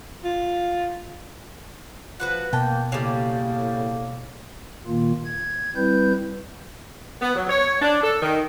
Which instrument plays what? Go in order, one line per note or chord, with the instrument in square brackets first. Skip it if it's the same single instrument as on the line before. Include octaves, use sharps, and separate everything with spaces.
[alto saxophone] F4
[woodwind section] F3 [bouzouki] F#4 B4 F#5
[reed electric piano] B2 A5 [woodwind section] A#3 [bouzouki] G5
[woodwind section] A2 A#3 [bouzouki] C#3 G3
[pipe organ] A#2 D#3 A#3 F4
G#6
G3 C4 E4 B4 G6
[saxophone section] B3
F#3
C#5
D4
A4
D#3